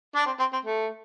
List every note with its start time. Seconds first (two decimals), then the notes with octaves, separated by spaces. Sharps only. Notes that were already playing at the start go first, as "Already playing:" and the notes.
0.15 D4
0.26 C4
0.39 C4
0.53 C4
0.65 A3